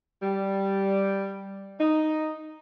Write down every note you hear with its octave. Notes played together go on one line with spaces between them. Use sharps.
G3
D#4